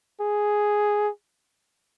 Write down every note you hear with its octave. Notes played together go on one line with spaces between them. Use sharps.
G#4